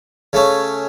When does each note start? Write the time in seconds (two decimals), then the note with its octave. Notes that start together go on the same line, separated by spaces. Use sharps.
0.33 C#3 A3 C#4